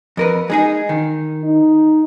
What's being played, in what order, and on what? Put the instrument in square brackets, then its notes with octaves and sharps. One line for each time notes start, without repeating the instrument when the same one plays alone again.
[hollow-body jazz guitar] F2 A#4 B4
G#3 D#4 G#4
D#3
[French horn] D#4